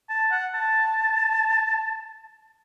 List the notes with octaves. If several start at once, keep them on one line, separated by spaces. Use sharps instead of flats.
A5
F#5
A5